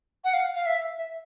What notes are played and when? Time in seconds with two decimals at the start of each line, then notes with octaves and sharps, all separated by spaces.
0.24 F#5
0.34 F5
0.55 F5
0.66 E5
0.98 E5